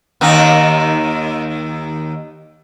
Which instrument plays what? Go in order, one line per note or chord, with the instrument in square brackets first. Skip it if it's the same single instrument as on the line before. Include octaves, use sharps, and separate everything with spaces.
[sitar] D#2 D#3 D#4